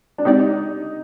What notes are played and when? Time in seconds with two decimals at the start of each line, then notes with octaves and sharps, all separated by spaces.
0.18 D4
0.25 G#3 C4 D#4 G4 D5